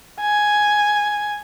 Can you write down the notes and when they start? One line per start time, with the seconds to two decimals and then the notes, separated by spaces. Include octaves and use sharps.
0.21 G#5